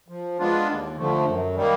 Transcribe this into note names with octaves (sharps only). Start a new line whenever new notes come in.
F3
G#3 B3 D4 F4
D#2
D3 F3 A3
F#2
D#3 G3 A#3